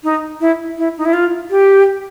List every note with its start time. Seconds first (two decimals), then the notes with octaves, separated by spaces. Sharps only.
0.04 D#4
0.40 E4
0.78 E4
0.98 D#4
1.05 E4
1.13 F4
1.50 G4